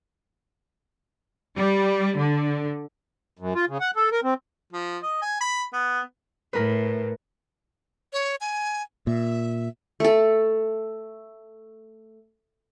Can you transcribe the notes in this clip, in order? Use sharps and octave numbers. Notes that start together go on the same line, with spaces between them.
G3
D3
F#2
F4
C#3
F#5
A4
A#4
C4
F3
D#5
G#5
B5
B3
A2 A#4 B4
C#5
G#5
A#2 E5
A3 A4